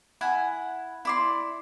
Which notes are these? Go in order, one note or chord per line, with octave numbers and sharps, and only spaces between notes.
E4 F#5 G#5
E4 D5 C6